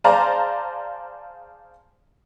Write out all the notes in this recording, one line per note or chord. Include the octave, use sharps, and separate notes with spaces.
G#4 C5 D5 F5 A5 A#5